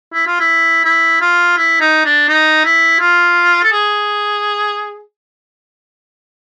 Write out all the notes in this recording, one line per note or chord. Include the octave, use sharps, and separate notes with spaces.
E4
F4
E4
E4
F4
E4
D#4
D4
D#4
E4
F4
A4
G#4